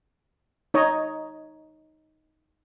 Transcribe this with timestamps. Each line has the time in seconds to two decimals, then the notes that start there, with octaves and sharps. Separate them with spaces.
0.74 D#4 C#5 D#5